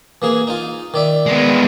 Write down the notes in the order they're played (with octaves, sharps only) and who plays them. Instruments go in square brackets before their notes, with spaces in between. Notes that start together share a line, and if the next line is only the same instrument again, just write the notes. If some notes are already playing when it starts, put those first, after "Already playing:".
[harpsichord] E3 A#3 G#4
D#4 F4
D#3 D5 E5
[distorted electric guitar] G#3 B3